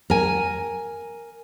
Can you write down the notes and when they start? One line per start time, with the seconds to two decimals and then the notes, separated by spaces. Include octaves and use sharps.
0.10 A#4 G#5